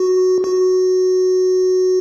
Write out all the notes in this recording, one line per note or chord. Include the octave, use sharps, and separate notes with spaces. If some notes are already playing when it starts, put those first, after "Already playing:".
Already playing: F#4
F#4